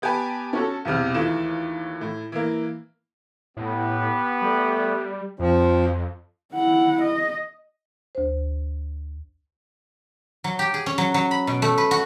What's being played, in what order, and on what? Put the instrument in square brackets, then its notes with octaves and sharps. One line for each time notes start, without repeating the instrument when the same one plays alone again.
[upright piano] B3 G4 B4 G#5 A5
C#4 F#4 A4
B1 E2 C3 F6
D#2 E3 A3 F4 E7
A2
E3 A#3
[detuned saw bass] A2 [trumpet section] B3 G4
[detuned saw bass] G3 [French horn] A3
[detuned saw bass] F2 [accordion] F3 [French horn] C4
[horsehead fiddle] E4 F#5
D#5
[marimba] D2 C5
[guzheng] F#3
G4
G#4
C#4
F#3
F#3
B5
B2
A3
B4
F#4